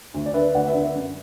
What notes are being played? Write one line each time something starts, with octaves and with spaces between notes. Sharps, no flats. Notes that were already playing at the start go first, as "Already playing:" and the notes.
D2
D5
D3 B4 E5
D2 D5 F#5
B4 E5
D3
B4 E5
F#2